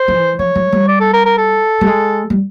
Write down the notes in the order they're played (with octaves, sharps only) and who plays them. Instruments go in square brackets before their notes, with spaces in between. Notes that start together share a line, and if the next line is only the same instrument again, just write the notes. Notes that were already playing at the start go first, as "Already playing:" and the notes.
Already playing: [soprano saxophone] C5
[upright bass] F3
E3
[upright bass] F3 [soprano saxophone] C#5
[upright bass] F#3
G3
[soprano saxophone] D5
A4
A#4
A#4
A4
[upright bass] G3
G#3
G3